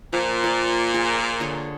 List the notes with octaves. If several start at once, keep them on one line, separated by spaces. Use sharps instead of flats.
A#2 F3
F3 A#3 D5
F4 G#4 A#5
D3 G#4 C#5